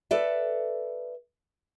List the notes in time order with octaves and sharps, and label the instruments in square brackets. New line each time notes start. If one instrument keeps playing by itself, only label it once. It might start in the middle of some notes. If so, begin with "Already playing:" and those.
[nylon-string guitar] A4 B4 D5 E5